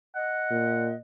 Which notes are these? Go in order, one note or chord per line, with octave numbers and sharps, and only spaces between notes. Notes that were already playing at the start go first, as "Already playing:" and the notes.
D#5 F#5
A#2